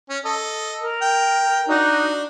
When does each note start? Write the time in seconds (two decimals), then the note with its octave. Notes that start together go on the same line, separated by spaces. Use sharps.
0.09 C#4
0.25 A4 D#5
0.80 A#4
1.01 G5
1.68 D4 D#4 F#4